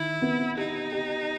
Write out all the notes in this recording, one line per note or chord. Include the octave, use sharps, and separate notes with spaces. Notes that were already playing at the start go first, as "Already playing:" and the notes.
Already playing: D#3 E4
B3
D#4 G4
G4